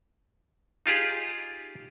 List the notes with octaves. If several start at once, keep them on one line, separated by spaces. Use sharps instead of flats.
D#4 F4 G4 G#4